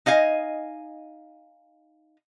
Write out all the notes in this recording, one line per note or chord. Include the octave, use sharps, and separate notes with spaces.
D#4 D#5 F5 G#5